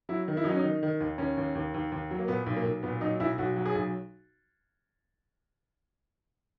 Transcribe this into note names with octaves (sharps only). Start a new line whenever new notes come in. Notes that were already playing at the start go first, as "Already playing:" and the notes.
F#3 E4
D#3
E4
F#3 D#4
C#4
D#3 D#4
D#3
D#2
D#2 C#4
D#2
D#2
D#2
D#2
F#3
A#3
A#2 B3
B1
A#3
B1
A#2 B3
F#3 D#4
B1 E4
B1 F#4
F#3 F#4
G#4
B1